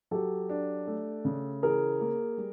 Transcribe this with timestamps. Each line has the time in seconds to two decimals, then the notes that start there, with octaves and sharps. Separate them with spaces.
0.11 F#3 G4 A4
0.49 D4
0.87 A3
1.25 C#3
1.63 E3 G#4 A#4
2.01 A#3
2.38 G3